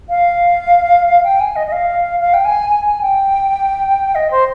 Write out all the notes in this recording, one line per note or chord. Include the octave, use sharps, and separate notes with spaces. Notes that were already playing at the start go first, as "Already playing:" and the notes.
F5
G5
G#5
D#5
D#5
F5
F5
G5
G#5
G#5
G#5
G5
D#5
C5